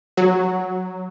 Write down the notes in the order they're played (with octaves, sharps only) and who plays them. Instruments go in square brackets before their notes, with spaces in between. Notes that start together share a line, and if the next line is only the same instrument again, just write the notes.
[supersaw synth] F#3